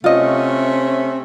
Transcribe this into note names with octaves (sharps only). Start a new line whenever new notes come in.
C3 A3 C#4 F4 D#5